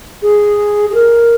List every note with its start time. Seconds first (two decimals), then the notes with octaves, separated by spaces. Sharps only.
0.22 G#4
0.90 G#4
0.94 A#4